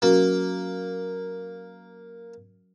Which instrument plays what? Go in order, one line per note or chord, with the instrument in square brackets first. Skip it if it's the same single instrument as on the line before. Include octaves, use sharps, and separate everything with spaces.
[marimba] F#3 C#4 F#4 [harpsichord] A#3